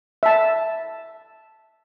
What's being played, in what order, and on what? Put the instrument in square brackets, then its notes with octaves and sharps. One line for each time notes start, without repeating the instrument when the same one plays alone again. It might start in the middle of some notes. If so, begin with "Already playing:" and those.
[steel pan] E5 A5